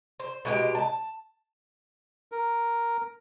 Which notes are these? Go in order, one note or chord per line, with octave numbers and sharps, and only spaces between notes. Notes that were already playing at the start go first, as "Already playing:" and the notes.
C5
B2 G#3 G4
A5
A#4